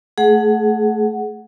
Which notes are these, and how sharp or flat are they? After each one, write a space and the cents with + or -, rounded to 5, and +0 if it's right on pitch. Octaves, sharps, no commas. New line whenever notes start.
A3 +0 G#4 +20 F#5 +0